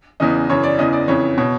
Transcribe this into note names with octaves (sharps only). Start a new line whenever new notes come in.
E2 C#3 E3 D#5
F#2 C#3 E3 C#5
D5
E2 C#3 E3 D#5
D5
F2 C#3 E3 C#5
B2 C#5